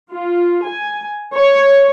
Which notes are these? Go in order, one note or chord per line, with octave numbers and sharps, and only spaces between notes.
F4
G#5
C#5